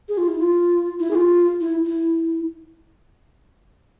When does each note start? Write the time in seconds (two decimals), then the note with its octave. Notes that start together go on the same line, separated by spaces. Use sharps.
0.09 G#4
0.18 F4
0.28 E4
0.38 F4
1.00 E4
1.11 G#4
1.15 F4
1.61 E4
1.86 E4